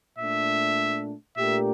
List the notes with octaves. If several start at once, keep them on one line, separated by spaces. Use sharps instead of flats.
A#2 A3 D4 E5
A#2 A3 D4 G4 A#4 E5